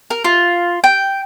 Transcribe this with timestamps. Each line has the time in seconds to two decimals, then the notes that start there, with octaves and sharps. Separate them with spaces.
0.10 A#4
0.24 F4
0.84 G5